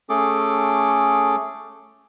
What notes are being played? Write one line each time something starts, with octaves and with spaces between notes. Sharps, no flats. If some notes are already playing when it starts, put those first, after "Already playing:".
A3 C#4 G#4 A4 D6